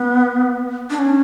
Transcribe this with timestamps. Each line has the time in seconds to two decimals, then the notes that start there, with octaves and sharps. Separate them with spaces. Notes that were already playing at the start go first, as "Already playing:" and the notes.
Already playing: B3
0.90 D4
0.99 C#4